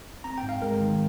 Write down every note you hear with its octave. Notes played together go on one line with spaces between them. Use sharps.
C4 A#5
G5
G#2
F5
G#3 A#4
D#3